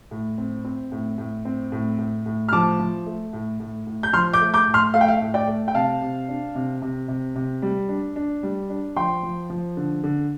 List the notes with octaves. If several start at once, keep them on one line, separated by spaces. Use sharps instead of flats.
A2
C4
C4
A2
A2
C4
A2
A2
A2
F6
F3 A5 D6
F3
A3
A2
A2
A2
G6
F3 C6 F6
D6 G6
A3
D6 G6
A2
C6 F6
A3 F5
G5
F5
A2
D5 G5
A3
G5
C3 F5 A5
C3
D4
C3
C3
C3
C3
G3
D4
D4
G3
D4
F3 G5 C6
F3
F3
D3
D3